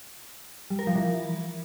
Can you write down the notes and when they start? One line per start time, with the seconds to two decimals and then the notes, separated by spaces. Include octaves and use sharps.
0.70 G3
0.79 A#4
0.87 F3
0.95 E3